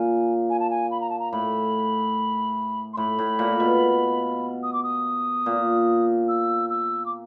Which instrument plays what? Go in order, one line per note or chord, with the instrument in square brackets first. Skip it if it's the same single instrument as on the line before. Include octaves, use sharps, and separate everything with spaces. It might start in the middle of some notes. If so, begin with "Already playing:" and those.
Already playing: [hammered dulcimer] A#2 [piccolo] G#5
[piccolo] G#5
A5
G#5
B5
A#5
A5
A#5
[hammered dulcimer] A2 [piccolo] B5
[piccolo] C6
[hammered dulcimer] A2 [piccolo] B5
[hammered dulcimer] A2
A#2
B2
[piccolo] D#6
D6
D#6
[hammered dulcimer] A#2
[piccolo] E6
E6
D6